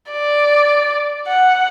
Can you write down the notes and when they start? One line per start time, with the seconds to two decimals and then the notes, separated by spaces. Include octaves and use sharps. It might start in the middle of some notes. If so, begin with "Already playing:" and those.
0.12 D5
1.28 F#5